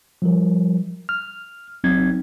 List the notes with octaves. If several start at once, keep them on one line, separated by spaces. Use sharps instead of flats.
F3 G3 A#4
F6
G1 F#3 C4 D#4 G#6